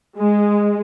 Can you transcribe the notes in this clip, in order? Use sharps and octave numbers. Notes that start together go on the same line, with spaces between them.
G#3